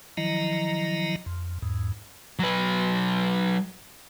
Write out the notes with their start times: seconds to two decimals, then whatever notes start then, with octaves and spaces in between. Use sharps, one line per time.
0.17 D#3 F3 F#3 E4 D#5 A#5
1.26 F2
1.62 E2 G#2
2.39 F#3 B4